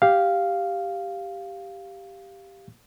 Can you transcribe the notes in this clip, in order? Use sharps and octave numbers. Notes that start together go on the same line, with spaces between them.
G4 F5